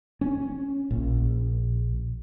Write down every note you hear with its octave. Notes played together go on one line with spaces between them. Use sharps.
C#4
A#1